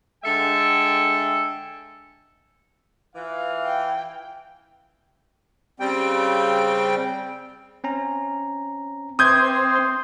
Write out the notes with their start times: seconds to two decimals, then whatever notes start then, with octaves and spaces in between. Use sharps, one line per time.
0.25 D3 G#3 A4 E5 G5 G#5
3.15 E3 F4 F5
3.66 G5
5.80 C#3 G3 C4 G5
7.84 C4 C#4 A#5
9.19 C4 B4 E5 D6 D#6 G6 G#6
9.76 C6